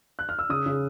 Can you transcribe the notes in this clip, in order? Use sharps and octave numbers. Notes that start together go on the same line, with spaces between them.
F#6
F6
E6
C#3 D#6
C#3